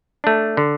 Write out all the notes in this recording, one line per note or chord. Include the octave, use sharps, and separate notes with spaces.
A3 D4
D3